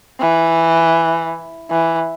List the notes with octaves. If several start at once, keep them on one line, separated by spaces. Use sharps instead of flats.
E3
E3